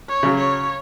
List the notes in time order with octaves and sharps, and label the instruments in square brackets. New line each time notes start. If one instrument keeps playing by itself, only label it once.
[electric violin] C#5
[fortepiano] C#3 F#3
[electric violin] C#5